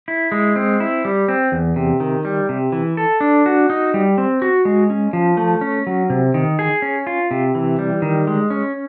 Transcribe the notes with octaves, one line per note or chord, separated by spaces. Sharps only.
E4
G#3
C4
E4
G3
C4
E2
C3
D#3
G3
C3
E3
A4
D4
F#4
D#4
G3
C4
F#4
G#3
C#4
F3
A3
C#4
F#3
C3
D#3
G#4
C#4
F4
C3
E3
G3
D#3
G#3
C#4